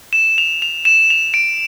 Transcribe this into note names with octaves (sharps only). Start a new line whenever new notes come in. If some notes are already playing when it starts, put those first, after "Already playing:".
E7
F7
F7
E7
F7
D7